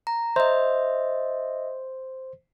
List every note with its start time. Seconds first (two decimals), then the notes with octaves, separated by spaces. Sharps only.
0.07 A#5
0.36 C5 D#5 E5